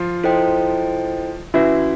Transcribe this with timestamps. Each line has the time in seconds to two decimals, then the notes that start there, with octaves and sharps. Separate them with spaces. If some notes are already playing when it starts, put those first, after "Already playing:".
Already playing: F3 F4
0.24 E4 A4 C5 D#5 G5
1.54 E3 C#4 E4 F#4 B4